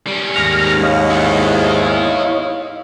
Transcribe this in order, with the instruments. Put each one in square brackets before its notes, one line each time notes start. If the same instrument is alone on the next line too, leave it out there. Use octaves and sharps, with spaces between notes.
[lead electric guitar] G3 C#4
[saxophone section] D#2 G#2 [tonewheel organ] F6 A#6
[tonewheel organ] C#5 D#5 F5
[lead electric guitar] E4 F#5